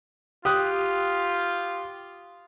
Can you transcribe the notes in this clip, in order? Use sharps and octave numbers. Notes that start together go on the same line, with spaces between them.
F4 G4 D#6 F#6